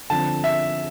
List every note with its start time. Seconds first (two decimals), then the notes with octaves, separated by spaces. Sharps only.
0.10 D3 F3 C4 A5
0.44 E5